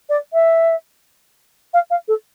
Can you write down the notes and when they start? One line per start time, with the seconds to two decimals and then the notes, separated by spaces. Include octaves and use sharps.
0.09 D5
0.33 E5
1.73 F5
1.90 F5
2.08 A4